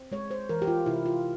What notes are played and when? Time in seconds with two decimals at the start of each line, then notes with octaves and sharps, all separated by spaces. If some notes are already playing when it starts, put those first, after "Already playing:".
Already playing: C4
0.12 G#3 C#5
0.31 C5
0.49 E3 A#4
0.62 G4
0.67 F4
0.86 C3 E4
1.06 F4